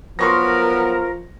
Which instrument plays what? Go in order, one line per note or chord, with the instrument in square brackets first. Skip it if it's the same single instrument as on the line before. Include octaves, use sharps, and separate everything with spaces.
[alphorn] F3 [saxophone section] F#3 B3 [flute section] A#4 [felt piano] C6 C#6 A#6